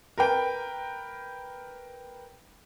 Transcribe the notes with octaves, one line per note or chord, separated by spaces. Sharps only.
A#4 B4 G5